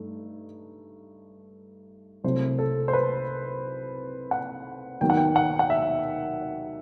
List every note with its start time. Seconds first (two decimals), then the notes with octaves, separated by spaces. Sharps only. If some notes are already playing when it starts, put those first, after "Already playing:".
Already playing: G2 A3 D#4
2.24 C2 C3 F#3 A3 C5
2.59 A4
2.88 C5
2.93 B4
4.31 F#5
5.01 D#2 D#3 F#3 B3 G5
5.10 F#5
5.17 G5
5.36 F#5
5.59 F#5
5.70 E5